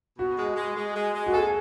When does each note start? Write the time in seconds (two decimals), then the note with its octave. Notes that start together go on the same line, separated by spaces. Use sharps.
0.18 B2 F#4
0.39 G#3
0.56 G#3
0.77 G#3
0.96 G#3
1.15 G#3
1.26 F#4
1.33 G#4 A4